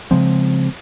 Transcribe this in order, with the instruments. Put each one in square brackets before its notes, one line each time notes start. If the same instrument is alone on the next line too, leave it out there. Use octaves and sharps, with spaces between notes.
[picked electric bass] C#3 F3 G#3 C4